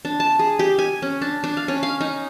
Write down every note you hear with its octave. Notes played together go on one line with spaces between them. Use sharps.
D4
A5
G#4
G4
G#5
C#4
D4
D4
F5
C#4
F5
D#4